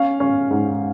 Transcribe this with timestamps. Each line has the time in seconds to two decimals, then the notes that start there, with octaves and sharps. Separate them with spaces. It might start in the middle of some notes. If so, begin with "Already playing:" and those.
Already playing: C#4 F5
0.20 C#4
0.51 G#2